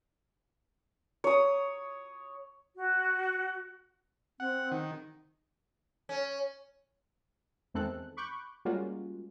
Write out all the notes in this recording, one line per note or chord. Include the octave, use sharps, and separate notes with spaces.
C#5 D#6
F#4
C4 F#5
D#3
C#4
E2 D#3 G#3 C4 A4 F#6
B5 C#6 D6 F#6 G6
G3 G#3 A#3 C#4 F4 F#4